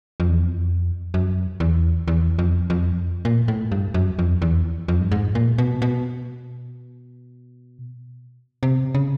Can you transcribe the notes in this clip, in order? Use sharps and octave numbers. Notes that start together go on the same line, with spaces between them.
F2
E2
F2
F#2
E2
E2
F2
F2
A#2
A2
G2
F#2
F2
E2
F2
G2
G#2
A#2
B2
B2
C3
C#3